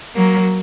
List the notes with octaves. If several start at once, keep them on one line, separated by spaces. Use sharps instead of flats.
F#3 A#3